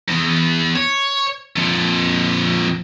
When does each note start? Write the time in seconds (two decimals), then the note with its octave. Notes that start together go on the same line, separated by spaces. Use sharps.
0.08 E2
0.76 C#5
1.56 F2 A#2